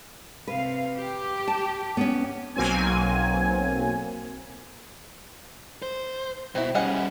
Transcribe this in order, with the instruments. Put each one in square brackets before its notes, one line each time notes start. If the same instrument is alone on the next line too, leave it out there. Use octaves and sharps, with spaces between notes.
[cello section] C3 F5 [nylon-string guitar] B4
[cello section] G4
[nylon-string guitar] A5
B3 C#4
[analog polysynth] B1 F#3 A#3 C4 G#5
[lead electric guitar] C5
[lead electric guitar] B2 [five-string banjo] C4 E4
[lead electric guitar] G3 C#4 [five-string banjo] G#4 D#5 F#5